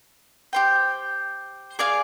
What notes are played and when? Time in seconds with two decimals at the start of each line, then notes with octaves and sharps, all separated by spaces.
0.53 G4 C5 G5
1.79 G#4 D5 F5 G#5